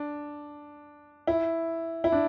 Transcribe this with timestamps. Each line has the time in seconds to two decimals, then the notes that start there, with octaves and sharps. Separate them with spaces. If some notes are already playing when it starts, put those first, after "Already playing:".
Already playing: D4
1.27 E4
2.04 E4
2.12 D4